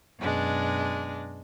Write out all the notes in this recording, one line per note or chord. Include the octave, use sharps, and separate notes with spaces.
F#2 B2 G#3 D4